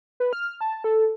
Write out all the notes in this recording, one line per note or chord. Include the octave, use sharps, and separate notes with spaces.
B4
F6
A5
A4